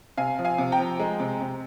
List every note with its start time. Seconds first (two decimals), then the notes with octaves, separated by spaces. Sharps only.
0.18 C3 F5 G#5
0.39 F3
0.45 F5 G#5
0.58 C3
0.72 G5 A#5
0.79 F3
0.99 G#3
1.20 C3
1.41 C3